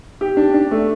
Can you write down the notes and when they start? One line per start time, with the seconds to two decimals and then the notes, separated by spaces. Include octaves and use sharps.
0.21 G4
0.37 D4
0.54 D4
0.71 A3